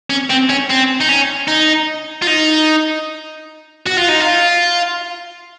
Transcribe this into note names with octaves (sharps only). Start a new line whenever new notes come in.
C#4
C4
C#4
C4
D#4
C#4
D#4
F4
D#4
F#4
F4
D#4
F4